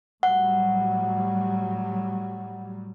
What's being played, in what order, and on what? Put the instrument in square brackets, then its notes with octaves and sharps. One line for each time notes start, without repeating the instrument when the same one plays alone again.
[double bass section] A2 F#3 G3 [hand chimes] F#5